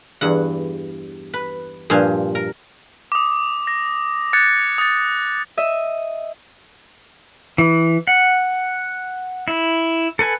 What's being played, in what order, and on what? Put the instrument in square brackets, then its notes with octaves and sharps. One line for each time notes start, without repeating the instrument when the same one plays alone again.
[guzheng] E2 G2 F#5
B4
G2 A#2 F3 C5 F5 G#5
A#4
[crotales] D6 D#6
A#6
F#6 G#6 A6 C#7
D#6 A6
[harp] D#5 E5
[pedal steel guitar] E3
F#5
E4
A4 B4 G#5